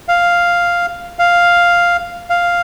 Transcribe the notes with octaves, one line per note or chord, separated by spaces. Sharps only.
F5
F5
F5